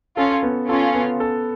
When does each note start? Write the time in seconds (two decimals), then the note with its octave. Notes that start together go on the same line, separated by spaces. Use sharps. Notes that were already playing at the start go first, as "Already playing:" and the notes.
0.17 C#4 F4 A4
0.43 B3
0.69 C#4 F4 A4
0.95 B3
1.20 A4